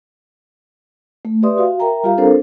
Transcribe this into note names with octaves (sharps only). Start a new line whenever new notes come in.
A3
G4 B4 D5 E5 C6 D#6
F#4 F5
A#4 E5 G5 A#5
G3 F4 G4 F5 A#5
C4 D4 A4 A#4 C5